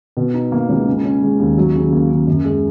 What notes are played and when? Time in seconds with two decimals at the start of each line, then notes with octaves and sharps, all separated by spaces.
0.17 B2
0.34 D#4
0.52 A#3
0.69 C#2
0.87 C#3
1.04 C#4
1.22 G#3
1.40 D#2
1.58 F#3
1.75 C#3
1.92 A#3
2.10 C#3
2.27 F#2
2.45 G#3